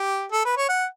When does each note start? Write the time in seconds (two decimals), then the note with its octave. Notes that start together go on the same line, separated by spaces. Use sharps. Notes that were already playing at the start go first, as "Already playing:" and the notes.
Already playing: G4
0.32 A4
0.45 B4
0.57 C#5
0.69 F#5